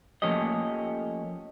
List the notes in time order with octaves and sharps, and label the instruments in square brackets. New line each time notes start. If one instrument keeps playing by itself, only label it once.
[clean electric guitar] F3 A3 A#3 C#4 G4 D#5